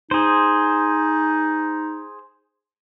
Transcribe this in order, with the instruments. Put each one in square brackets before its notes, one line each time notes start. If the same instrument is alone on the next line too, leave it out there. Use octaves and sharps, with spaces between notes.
[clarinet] D#4 [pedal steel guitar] G#4 C5